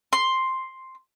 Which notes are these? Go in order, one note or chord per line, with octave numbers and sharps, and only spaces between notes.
C6